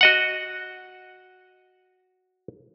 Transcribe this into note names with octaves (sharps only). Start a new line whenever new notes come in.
F#4 D#5 F#5